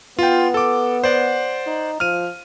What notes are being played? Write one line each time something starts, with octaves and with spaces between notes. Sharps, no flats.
B3 F4 G5
A4 D6
C5 D5 F#5
D#4
F3 F6 D#7